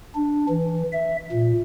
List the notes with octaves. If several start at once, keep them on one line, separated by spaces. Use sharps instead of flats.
D4
E3
E5
A#2